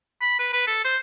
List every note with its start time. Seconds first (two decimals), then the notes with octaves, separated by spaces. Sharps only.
0.22 B5
0.39 B4
0.53 B4
0.67 A4
0.85 C5